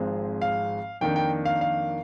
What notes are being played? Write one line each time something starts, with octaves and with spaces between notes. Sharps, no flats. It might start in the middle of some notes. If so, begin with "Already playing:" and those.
Already playing: G#1 G#2 F3 G#3 C4
F5
F2 D#3 A#3 D4 G5
G5
F5
F5